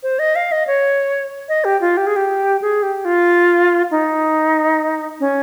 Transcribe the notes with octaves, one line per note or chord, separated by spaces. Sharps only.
C5
D#5
F5
D#5
C#5
D#5
G4
F4
G4
G#4
G4
G#4
G4
F4
D#4
C#4